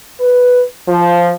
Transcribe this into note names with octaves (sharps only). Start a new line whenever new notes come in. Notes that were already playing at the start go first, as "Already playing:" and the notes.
B4
F3